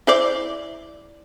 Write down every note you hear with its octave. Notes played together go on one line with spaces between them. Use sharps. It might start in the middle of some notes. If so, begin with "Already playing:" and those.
E4 C5 D5